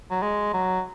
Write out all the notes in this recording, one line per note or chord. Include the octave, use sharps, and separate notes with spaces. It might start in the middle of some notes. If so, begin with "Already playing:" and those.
F#3
G#3
F#3